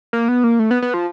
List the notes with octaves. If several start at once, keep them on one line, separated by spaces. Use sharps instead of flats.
A#3
B3
A#3
A3
B3
B3
F3